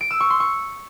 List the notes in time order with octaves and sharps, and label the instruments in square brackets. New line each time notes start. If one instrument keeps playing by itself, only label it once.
[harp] D7
E6
C#6
C6
C#6